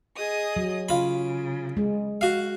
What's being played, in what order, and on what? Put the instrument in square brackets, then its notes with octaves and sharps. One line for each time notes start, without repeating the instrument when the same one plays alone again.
[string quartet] G#4 D#5 D#6
[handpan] F#3
[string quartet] C#3 [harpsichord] F4 B5
[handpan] G#3
[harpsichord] F#4 F5